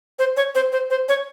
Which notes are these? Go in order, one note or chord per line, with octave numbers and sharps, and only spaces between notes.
C5
C#5
C5
C5
C5
C#5